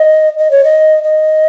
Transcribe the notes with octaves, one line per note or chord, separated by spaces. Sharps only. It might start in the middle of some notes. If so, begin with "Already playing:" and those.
Already playing: D#5
D#5
C#5
D#5
D#5